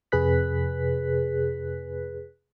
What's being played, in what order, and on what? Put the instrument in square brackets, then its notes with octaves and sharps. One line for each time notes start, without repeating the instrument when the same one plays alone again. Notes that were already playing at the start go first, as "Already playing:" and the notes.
[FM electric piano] F2 C3 G#4 B4 F#6 B6